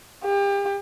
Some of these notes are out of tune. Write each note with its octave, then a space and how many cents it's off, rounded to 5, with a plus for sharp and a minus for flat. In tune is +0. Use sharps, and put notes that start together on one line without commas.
G4 +35